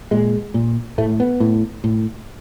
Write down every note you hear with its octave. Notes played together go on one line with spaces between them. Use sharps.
A#2 G#3
A#2
A2 A3
B3
A2
A2